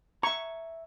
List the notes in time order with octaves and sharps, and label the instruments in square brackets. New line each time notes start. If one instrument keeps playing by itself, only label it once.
[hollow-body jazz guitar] E5 A#5 [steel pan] C#6